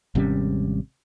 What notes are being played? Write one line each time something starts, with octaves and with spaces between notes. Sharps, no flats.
G#1 C3 G3 C#4